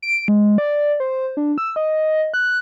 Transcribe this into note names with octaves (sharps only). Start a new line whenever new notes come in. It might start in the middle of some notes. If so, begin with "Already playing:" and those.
D7
G#3
D5
C5
D4
E6
D#5
F#6